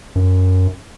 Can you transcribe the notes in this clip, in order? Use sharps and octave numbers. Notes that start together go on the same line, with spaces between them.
F#2